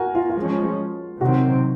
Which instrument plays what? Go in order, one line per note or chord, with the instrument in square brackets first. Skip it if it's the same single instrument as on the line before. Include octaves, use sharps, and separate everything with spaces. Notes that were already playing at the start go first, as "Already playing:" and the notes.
Already playing: [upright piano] F#4 A#4 G#5
F4
F4
[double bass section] F3 G#3 C#4
[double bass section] C3 D#3 F#3 C4 [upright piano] F#4